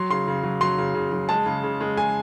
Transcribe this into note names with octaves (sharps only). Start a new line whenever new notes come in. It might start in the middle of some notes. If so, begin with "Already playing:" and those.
Already playing: F#3 C6
C#3 C6
C#3
F#3
F#3 C6
C#3
C#3
F#3
G#3 A5
C#3
C#3
G#3
G#3 G#5